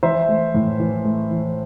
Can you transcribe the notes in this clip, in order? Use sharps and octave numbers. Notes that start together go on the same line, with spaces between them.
E3 C5 E5
A3
A2
E3
A3
E3